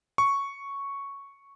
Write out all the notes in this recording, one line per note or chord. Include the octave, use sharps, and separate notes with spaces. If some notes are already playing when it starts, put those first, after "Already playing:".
C#6